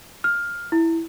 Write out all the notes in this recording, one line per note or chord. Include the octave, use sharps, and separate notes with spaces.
F6
E4